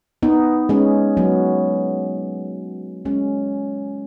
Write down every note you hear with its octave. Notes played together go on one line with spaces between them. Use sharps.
B3 D#4
G#3 C#4
F#3 B3
G#3 C#4